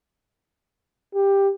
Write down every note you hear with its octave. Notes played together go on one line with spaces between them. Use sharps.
G4